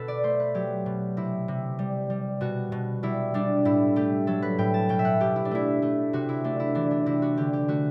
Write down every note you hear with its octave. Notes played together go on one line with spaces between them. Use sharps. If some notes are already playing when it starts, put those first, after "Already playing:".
Already playing: B2 A4 B4
D5
A3 C5
B4
F#3 G4
B2
C3 E4
C3
G3
G3
B2 F#4
B2
G3 E4
G3 D4
A2 E4
A3 G4
F#3 A4
B4
A2 G5
A5
B2 G5
E5
F#5
B2 G4
E4
D4
A3 E4
A3
C3 F#4
E4
A3 D4
E4
E3 D4
D4
C3 E4
F#4
D3 G4
G4
A3 F#4